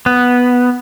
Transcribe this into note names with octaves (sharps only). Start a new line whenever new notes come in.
B3